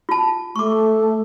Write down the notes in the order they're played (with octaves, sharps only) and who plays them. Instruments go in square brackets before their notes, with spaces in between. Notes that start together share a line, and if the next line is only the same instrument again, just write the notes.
[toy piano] F4 A5
[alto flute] A3 [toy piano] C#6 D6